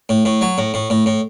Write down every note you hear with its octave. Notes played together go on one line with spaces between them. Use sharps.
A2
A2
F#3
A2
A2
A2
A2